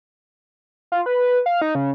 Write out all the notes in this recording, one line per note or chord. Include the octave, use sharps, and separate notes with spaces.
F4
B4
F5
D#4
C#3